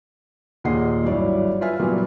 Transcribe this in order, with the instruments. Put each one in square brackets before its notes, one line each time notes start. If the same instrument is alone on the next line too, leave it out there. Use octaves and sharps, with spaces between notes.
[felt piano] D#2 A#2 G#4 D#5 F#5 C7
G#1 G2 F#3 E4 C#5 D5
F4 B4 E5 G#5 F6
A#2 E3 F#3 G3 A#3 B3